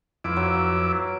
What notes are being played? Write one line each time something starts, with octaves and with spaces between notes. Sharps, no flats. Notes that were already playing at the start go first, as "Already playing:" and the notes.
F2 E4 F4 B4 D6
F#3